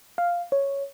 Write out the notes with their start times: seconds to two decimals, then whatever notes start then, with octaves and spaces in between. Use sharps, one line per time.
0.18 F5
0.52 C#5